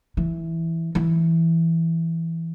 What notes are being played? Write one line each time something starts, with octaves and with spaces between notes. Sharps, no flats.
E3
E3